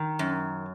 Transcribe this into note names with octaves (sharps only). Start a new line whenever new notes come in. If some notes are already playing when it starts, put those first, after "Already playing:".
Already playing: D#3
F#2